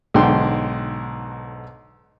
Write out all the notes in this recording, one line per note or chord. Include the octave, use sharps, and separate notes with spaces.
B1 G#2 D3 G5 C6